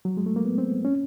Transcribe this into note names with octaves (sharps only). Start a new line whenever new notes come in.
F#3
G#3
A3
A#3
B3
C4
C#4